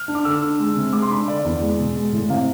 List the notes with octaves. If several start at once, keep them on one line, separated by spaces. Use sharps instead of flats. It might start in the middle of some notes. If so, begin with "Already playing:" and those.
Already playing: F6
D4
D6
D3 E6
D4
G#3
C3
G#3 D6
C6
D4 B5
D3 D5
E2
G#3
B2
G#3
A2
C3 F5